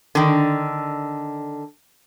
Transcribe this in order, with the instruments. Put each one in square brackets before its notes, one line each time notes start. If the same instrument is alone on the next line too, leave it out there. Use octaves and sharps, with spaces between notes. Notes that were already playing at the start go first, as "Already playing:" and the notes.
[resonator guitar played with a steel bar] D3 D#3